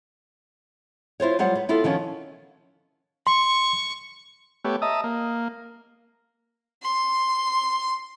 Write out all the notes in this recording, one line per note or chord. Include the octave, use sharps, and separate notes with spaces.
E4 F4 C5 C#5
F#3 G3 F4 C5 F#5
B3
B3 E4 F4 A4 B4
D#3 F3 B3 C#4
C6 C#6
A3 B3 G4 C#5
D#5 E5 A5 A#5 D#6
A#3
C6